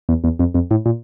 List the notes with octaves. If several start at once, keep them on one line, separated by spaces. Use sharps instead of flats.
E2
E2
F2
F2
A2
A#2